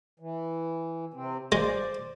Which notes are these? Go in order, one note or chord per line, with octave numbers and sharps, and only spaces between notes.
E3
C3 C4
G#3 C5 D5